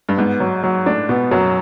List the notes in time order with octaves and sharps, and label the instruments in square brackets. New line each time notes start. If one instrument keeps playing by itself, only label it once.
[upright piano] G2
[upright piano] G#2 [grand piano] B3
[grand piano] F#3
F#3
[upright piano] A2 [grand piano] D4
[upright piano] B2 [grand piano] B3
[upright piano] F#2 [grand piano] F#3